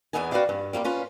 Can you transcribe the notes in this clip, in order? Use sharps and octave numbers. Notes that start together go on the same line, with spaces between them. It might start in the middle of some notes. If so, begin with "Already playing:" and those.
E2 G2 E3 B3 D#4 G#5
F#4 B4 C#5 D5 F5 G5
G2
G3 A#3 C#4 F4
C#4 F4 B4